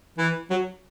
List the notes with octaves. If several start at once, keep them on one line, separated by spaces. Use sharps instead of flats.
E3
F#3